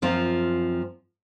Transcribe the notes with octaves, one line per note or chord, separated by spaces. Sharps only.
F#2 F3 C4 F4